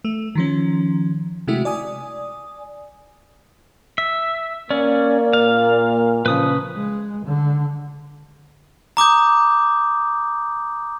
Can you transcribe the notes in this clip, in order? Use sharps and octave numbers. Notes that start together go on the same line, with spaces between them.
A3
D#3 F3 C#4
C3 G#3 A3 E4 F#4
D5 G#5 D#6
E5
A#3 C#4 D5
A#2 F5
A#2 C#3 F3 B4 D#6
G#3
D3
A#5 D6 D#6 G6